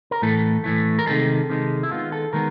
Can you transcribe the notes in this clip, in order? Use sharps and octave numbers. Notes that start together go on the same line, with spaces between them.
A#4
A2 E3 A3 A4
A2 E3 A3
A#4
C3 D#3 G#3 A4
C3 D#3 G#3
E4
D#3 G#3 B3 F4
A4
D#3 G#3 B3 A#4